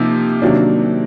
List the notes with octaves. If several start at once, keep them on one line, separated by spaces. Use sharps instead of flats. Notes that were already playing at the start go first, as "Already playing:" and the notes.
Already playing: C3 F3 A#3 D#4
C3 D#3 F#3 A#3 D4